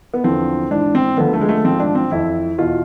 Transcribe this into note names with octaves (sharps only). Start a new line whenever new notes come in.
B3
E2 D3 F3 C4
G#2 E3 D4
C4
D2 D3 F3 B3
A3
G#3
A3
G#2 F3 C4
D4
C4
F2 E3 E4
E2 B2 F4